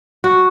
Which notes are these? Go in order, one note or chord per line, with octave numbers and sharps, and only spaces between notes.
F#4